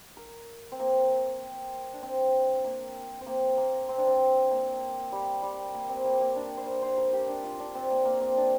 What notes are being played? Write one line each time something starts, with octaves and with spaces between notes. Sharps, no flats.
A#4
C4
A#3
D4
C4
A#3
C4
A#3
A#3
C4
D4
C4
A#3
G3
G3
A#3
C4
A#3
A#3
D4
C5
A#4
C5
A#4
G4
D4
F4
D4
C4
A#3
A#3
C4
D4